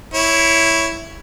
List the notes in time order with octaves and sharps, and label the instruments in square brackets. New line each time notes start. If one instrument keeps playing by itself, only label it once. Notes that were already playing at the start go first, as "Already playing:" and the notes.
[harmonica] E4 C#5